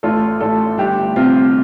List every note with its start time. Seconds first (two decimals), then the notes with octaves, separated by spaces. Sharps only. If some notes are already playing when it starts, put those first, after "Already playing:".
0.03 A1 F4 A4
0.41 A1 F4 A4
0.78 G1 D4 G4
1.16 C3 C4 F4